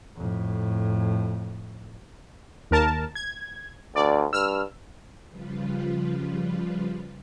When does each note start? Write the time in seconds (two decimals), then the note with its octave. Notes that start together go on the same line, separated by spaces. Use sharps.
0.17 F2 A2
2.71 D#2 A#4 A5
3.15 G#6
3.96 D2 D5
4.33 G2 E6 F6
5.29 C#3 F3 G3 F4 B4